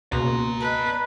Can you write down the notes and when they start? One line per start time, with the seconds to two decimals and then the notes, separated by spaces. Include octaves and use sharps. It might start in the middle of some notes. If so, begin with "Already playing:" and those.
0.12 C#2 B2 A#3 F#4 D5 A#5 C6
0.61 B4 D#5 A5